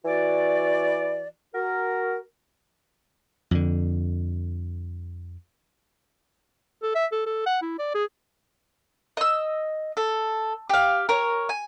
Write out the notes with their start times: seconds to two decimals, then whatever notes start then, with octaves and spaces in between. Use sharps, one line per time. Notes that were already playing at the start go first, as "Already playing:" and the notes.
0.05 E3 F#4 D5
1.54 F#4 A#4
3.51 F2 D3
6.83 A4
6.95 E5
7.12 A4
7.26 A4
7.46 F#5
7.62 E4
7.79 D5
7.94 G#4
9.17 D#5 E6
9.97 A4
10.69 G4 F5
11.09 A#4 C#5
11.49 G#5